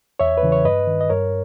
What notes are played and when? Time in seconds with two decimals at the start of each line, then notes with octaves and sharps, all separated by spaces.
0.20 E2 C#5 E5
0.37 B4
0.43 C#3 E3
0.52 C#5
0.65 G2 B4 D#5
0.87 D#3
1.01 D#5
1.10 G2 A#4 C#5